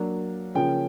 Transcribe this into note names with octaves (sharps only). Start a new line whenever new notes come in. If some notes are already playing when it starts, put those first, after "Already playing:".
Already playing: F#3 A#3 D4
C#3 F3 A#3 C#4 G5